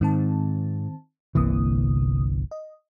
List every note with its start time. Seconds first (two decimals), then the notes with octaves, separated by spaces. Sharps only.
0.01 G#2 D#3 C4 A5
1.35 G1 C2 C3 E3 A#3 D#6
2.51 D#5